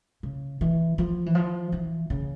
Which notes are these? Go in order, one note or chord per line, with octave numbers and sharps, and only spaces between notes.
C#3
E3
F3
E3
F3
E3
C#3